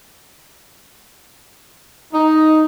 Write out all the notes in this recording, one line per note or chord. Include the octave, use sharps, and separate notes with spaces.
D#4